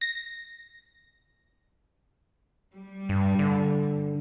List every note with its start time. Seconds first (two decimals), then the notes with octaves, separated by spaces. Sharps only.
0.01 A#6
2.74 G3
3.09 G2
3.39 D3